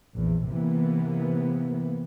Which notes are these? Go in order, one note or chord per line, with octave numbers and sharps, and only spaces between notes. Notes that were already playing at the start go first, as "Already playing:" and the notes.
A#1 E2
C3 E3 A#3 B3